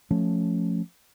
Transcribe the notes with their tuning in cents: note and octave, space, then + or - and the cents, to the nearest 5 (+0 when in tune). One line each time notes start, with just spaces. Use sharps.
F3 +0 A3 +0 C#4 +0